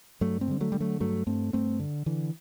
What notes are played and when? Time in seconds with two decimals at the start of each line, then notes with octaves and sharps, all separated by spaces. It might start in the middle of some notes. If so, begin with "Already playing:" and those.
0.21 G2 F#3 A3
0.41 A3 C4
0.48 D3 G3
0.60 F#3 A3
0.72 D3 G3
0.81 F#3 A3
1.00 G2 F#3 A3
1.27 G2 A3 C4
1.53 G2 A3 C4
1.80 D3
2.06 D3 E3